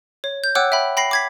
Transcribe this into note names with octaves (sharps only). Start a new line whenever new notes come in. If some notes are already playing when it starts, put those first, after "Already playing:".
C#5
G6
C#5 F#5 G5 D6 E6 F#6
E5 G5 B5
G5 B5 A#6 C7
D6 G#6 B6